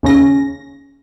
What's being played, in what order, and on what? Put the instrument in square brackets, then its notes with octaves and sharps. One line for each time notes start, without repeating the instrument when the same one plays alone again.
[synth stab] D#2 C#3 C#4 A#6